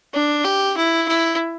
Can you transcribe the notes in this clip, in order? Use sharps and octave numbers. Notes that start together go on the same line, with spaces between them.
D4
G4
E4
E4